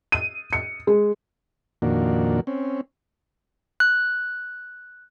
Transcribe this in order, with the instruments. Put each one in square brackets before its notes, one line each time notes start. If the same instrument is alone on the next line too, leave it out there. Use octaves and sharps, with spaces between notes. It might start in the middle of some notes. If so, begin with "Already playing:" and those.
[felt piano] D#7
C#7
G#3
[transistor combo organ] F2 A#2 D#3 A#3 D4 F#4
C4 C#4
[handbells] F#6